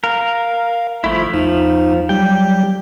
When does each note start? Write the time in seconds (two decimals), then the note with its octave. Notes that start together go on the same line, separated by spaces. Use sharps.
0.04 A#4 F5
1.04 G#1 F3 A3 E4
1.34 E2 F3 D#4
2.09 F#3 G3 G4 G5